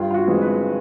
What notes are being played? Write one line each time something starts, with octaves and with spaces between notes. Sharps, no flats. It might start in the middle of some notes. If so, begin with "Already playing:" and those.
Already playing: G2 F4
F4
F#4
E3 G#3 C4
B4